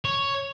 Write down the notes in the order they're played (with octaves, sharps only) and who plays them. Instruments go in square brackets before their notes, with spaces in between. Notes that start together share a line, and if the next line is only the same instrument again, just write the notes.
[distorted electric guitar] C#5